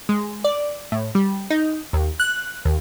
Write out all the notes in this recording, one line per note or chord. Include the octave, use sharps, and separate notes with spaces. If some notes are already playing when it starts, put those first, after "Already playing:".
G#3
D5
A2
G3
D#4
D#2
F#6
D#2